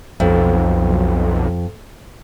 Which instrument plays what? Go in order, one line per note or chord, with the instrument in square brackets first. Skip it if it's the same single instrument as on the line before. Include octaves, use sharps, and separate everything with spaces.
[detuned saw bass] B1 [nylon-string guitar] F2